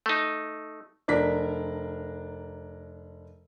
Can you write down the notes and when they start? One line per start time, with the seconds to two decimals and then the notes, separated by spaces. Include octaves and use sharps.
0.06 A3 D#4
1.08 F1 D4 A#4 B6